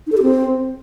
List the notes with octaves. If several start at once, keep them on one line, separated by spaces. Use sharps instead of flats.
D#4
A4
G4
C4